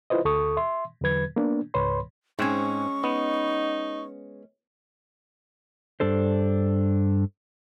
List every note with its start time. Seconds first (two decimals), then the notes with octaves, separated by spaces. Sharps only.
0.10 E4 F4 B4 C5 D#5
0.25 D2 A4 C#6 D#6
0.57 E5 C6
1.01 E2 D3 F#3 B4 G#6
1.36 A#3 B3 D4
1.74 C#2 G#2 B4 C#5 B5 C6
2.39 G#2 G#3 C4 C#4 G#5 C#6
3.04 B3 D#4
6.00 G2 D4 A4 C5